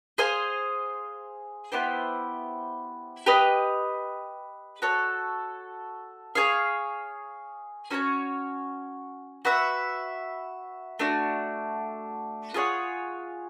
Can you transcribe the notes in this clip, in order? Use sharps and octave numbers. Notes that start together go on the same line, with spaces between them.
G#4 C5 F5 G#5
B3 E4 G4 C5
G4 B4 D#5
F#4 A4 C#5
G#4 C#5 F5
C#4 F#4 A#4 C#5
F#4 B4 E5
A3 D4 F#4
F4 G#4 C#5 F#5